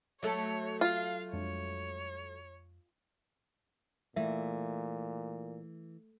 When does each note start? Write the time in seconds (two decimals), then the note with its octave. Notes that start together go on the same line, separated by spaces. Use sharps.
0.23 F#3 A3 A4 C#5
0.81 F4 F5
1.33 F2 G#3 D4 C#5
4.16 A#2 E3 A3 E5